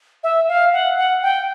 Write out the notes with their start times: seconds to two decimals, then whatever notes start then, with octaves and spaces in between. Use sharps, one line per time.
0.23 E5
0.48 F5
0.73 F#5
0.97 F#5
1.22 G5